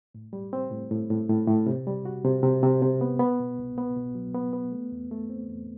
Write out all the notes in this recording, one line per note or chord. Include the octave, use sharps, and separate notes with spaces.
A2
G3
C4
A2
A2
A2
A2
A2
C3
G3
F#4
C3
C3
C3
C3
B3
B3
B2
C2
B3
B2
F#3
B3
B3
A3
E2
A3
C4
E2